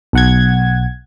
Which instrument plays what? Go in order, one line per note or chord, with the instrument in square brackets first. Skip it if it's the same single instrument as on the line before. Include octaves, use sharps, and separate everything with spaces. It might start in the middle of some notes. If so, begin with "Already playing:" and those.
[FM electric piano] B1 F#5 G#6